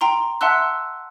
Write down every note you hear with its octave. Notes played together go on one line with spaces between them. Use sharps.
G5 A#5 C6
E5 F#5 A5 C6 E6 F#6